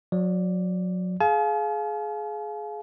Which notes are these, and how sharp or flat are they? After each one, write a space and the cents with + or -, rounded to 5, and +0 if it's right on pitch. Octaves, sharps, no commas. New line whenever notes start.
F#3 -30 D5 +0
G#4 +20 F5 +0 G#5 +45